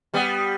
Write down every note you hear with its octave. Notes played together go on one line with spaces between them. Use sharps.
G3 B3